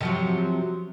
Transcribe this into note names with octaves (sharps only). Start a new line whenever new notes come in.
C3 F3 F#3